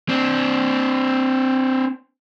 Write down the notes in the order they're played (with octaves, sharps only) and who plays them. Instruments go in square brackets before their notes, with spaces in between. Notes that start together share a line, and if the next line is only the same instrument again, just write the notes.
[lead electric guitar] C4 D4